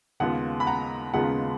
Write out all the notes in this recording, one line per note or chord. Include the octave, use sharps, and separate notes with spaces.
D#2 C#3 G#3 B3 F4 F#5
B5
F#5 A#5
D#2 C#3 G#3 B3 F4 F#5